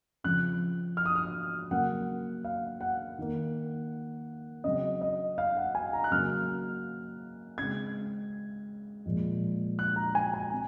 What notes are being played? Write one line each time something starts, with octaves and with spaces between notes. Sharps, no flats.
C#3 F3 C4 F#6
F6
D#6
F6
C#3 F#3 A#3 F#5
F5
F#5
D#3 A#3
C#3 F#3 C4 D#5
D#5
F5
F#5
G#5
A#5
F#6
C#3 F#3 A#3 F6
C#3 G#3 C4 G#6
A#2 F3 G#3
F#6
A#5
G#5
G#5
C4